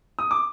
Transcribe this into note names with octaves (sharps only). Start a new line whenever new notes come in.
D#6
D6